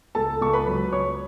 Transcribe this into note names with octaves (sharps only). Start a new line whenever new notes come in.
C#2 A4 A5
C#2 C#6
B4 B5
F#3
C#2 C#5 C#6